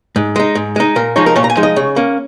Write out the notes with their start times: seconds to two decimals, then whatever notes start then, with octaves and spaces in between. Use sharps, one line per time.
0.16 G#2
0.36 G#3 D#4
0.55 G#2
0.76 G#3 D#4
0.96 A#2 A#4
1.16 F3 G#3 D#4 C#5
1.26 A#4
1.36 A#2 C#5
1.44 A#5
1.50 G#5
1.57 F3 G#3 D#4
1.63 D#5
1.76 C#3 C#5
1.96 A#3 C#4